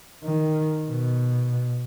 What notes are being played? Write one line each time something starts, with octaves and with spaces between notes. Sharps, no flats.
D#3
B2